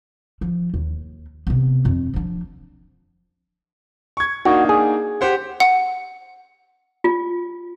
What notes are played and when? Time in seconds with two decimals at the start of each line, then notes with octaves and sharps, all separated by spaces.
0.41 F3
0.74 D#2
1.47 C3 B3
1.85 F2
2.13 F3 D4
4.17 C#6 G#6
4.45 A#3 D4 D#4 F#4
4.69 G#4
5.21 G4 C5 F#5
5.60 F#5
7.04 F4